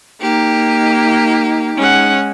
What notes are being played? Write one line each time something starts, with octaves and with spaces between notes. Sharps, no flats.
A#3 D#4 G4
G#3 C#4 F#5